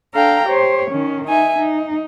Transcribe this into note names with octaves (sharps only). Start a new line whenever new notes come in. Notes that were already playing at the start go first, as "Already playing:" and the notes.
D4 A4 F5 G5 A#5
G4 C5 C#5
D#3 C#4
D#4 E5 G#5
D#4